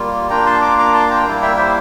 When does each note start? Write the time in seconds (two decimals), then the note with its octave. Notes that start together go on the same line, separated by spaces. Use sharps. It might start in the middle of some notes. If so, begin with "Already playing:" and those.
Already playing: G3 A#3 F4
0.30 A#3 D4 F4 G5 A#5
0.46 A5 C6
0.61 A#5 D6
0.79 A#5 D6
0.93 A5 C6
1.10 G5 A#5
1.26 G3 A#3 E4
1.42 E5 G5
1.57 C5 E5